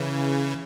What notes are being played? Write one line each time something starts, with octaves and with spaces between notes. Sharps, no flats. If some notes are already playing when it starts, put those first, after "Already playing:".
Already playing: C#3 E3